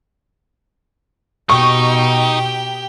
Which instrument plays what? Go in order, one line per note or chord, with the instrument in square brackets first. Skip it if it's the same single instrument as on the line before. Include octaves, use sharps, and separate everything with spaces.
[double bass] B2 [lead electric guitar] D#4 [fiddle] G4 G5 [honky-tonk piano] C#6